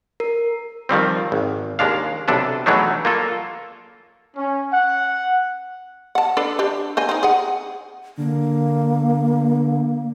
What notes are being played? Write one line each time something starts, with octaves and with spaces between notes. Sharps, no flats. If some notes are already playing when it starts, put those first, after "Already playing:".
A#4
D#3 F3 G3 C4
G#1
D#2 G#3 D4 F5
B1 C3 D4 A4 B4
E3 F#3 G#3 A3 D4 D#4
A#3 F4 A4
C#4
F#5
F#5 A5
D4 A4 B4
D4 G4
C5 D#5 G#5
C4 D#4
G#4 F#5
D3 A#3